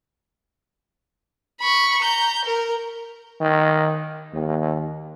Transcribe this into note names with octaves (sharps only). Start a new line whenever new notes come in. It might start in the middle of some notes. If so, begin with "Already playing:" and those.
B5 C#6
A#5 G6
A#4
D#3
D#2